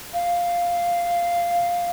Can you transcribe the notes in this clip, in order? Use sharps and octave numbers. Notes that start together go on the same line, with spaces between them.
F5